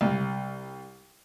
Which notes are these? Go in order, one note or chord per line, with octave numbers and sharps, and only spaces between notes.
C2